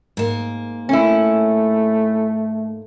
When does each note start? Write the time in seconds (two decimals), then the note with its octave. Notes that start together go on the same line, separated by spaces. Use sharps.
0.17 G#2 A#3
0.89 A3 C#4 E4